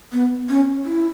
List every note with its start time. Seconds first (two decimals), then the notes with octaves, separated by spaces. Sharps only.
0.13 B3
0.49 C#4
0.85 E4